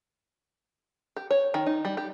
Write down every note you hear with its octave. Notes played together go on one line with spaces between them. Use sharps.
G4
C#5
D#3
D#4
G3
G4